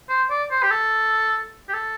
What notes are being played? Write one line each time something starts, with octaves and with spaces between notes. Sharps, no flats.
C5
D5
C5
G4
A4
G4
A4